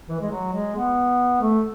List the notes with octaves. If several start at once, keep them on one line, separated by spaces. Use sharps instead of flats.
E3
G#3
F#3
G#3
B3
A3